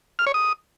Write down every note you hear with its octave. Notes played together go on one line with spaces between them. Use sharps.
F6
C#5
D#6